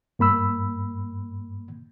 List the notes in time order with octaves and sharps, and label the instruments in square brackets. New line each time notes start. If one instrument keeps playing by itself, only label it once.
[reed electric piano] G2 A#3 B5 E6